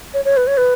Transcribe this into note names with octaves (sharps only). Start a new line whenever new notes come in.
C#5
C#5
B4
C#5
B4